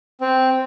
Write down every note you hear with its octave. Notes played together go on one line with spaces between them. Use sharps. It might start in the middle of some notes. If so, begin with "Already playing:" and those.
C4